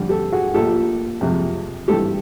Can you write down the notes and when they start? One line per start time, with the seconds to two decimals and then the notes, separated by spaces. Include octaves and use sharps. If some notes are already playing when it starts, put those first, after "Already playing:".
Already playing: F2 D3 G3
0.09 G4 A4
0.32 F#4 G#4
0.54 A#1 A#2 F3 G4 A4
1.21 F2 C3 F3 G#3
1.88 G#1 G2 E3 G4 A4